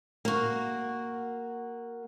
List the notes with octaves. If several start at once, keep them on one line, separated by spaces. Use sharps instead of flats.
A#3 F#4